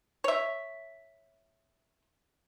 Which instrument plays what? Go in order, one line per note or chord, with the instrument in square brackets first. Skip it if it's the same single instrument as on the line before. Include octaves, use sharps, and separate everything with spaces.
[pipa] C#5 E5